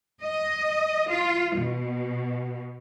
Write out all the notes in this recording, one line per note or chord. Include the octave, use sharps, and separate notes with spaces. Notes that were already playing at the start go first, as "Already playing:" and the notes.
D#5
F4
B2